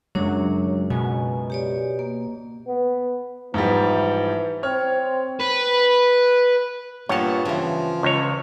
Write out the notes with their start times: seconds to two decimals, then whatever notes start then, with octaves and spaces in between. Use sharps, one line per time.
0.15 C#2 F#2 F#3 D4 C#5
0.90 B2 G#5
1.50 G4 C#5 D5
1.99 A#3
2.67 B3
3.54 G#2 E3 F3 G3
4.63 C4 C#5 F6
5.40 B4
7.09 G2 A#2 B3 C#5 A5
7.45 C#3 E3 F3
8.03 C#2 C#5